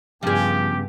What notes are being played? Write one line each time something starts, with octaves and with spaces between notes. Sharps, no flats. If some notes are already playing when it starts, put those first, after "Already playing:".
G2 C#3 F3 B3 C#4 G4 G#4